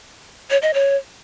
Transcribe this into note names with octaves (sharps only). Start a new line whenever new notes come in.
C#5
D#5
C#5